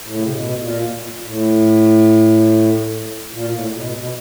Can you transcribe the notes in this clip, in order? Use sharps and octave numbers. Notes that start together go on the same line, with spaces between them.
A2
C#3
C3
B2
A#2
A2
A#2
A2
B2
B2